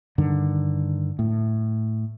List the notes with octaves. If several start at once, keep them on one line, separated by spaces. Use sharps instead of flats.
G2 D3 D#3
A2